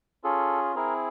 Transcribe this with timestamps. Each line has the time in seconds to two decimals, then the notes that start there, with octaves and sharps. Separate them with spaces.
0.24 C#4 F4 G#4 A4
0.75 C4 E4 G#4 A#4